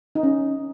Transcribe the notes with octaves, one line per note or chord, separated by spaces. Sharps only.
D#4
C#4